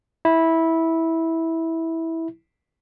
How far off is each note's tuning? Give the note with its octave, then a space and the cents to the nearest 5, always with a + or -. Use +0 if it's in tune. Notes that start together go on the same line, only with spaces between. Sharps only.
E4 -15